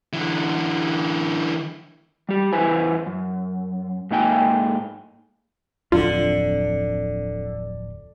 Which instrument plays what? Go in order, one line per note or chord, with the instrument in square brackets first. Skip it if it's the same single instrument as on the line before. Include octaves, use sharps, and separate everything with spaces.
[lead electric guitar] D3 E3
[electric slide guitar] G3 G4
E2 E4 B4 C5 G#5
F#2
G#2 A#3 D#4 D#5 G5 G#5
[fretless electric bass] D1 F2 D4 [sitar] D3 [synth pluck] F4